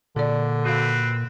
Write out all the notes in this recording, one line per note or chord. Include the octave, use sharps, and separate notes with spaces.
A#2 D3 G#4 D5
C4 F#4 B4 F5